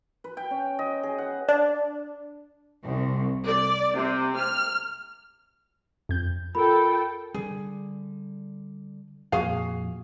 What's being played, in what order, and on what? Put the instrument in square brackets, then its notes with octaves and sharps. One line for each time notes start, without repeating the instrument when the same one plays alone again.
[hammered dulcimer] B4
G5
C#4
D#5
G#4
F#5
[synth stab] D4
[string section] C2
D5
C3
F6
[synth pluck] F2 G6
[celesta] F4 A#4 B5 [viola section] A4 G5
[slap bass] D3 G3 [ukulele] G#4
[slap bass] F2 A#2 A#3 [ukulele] F#4 G#4 F5